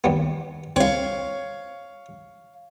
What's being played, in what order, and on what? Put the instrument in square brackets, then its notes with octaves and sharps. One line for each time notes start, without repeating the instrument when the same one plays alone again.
[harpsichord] D#2 G3 B3
[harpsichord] C2 C4 [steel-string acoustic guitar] C#5 F5